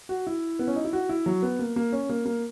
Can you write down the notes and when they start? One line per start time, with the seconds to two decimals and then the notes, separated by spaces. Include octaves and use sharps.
0.09 F#4
0.27 E4
0.59 B3
0.67 C#4
0.76 D#4
0.85 E4
0.93 F#4
1.09 E4
1.26 F#3
1.43 B3
1.59 A#3
1.76 A#3
1.92 C#4
2.09 A#3
2.26 A#3